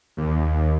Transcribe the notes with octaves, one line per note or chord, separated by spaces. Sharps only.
D#2